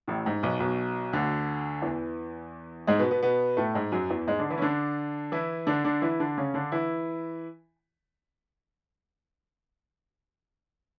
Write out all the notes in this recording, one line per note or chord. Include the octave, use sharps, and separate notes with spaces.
A1 A2
G#2
B1 B2
B1 B2
D2 D3
E2 E3
G#2 G#3
B2 B3
B2 B3
B2 B3
A2 A3
G#2 G#3
F#2 F#3
E2 E3
G#2 G#3
D3 D4
E3 E4
C#4
D3 D4
E3 E4
D3 D4
D3 D4
E3 E4
D3 D4
C#3 C#4
D3 D4
E3 E4